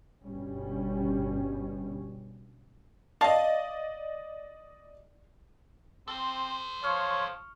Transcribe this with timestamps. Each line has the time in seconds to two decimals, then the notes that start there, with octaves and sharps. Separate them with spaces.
0.23 G1 B2 G3 C#4
3.21 D5 D#5 F5 A5
6.08 C4 A4 C5
6.84 F3 C#5 C#6 F6